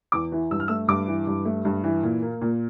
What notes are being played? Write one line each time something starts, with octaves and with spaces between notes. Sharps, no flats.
E2 D6
E3
G2 E6
F6
A3 E6
G2 D6
E3
G2
A3
G2
E3
A#2
A#3
A#2